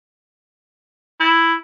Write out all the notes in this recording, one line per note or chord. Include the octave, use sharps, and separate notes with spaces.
E4